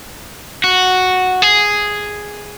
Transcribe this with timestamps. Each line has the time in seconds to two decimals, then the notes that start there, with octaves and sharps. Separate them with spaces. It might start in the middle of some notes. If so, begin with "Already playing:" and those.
0.64 F#4
1.42 G#4